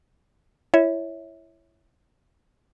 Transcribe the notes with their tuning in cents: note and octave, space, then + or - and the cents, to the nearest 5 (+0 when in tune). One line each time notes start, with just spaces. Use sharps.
E4 +20 C#5 +0 E5 -20